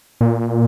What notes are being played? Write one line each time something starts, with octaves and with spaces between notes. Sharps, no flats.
A#2